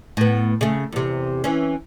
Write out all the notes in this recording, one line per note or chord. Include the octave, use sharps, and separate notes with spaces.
A2 B3
C#3 A3
E2 C3
E3 C#4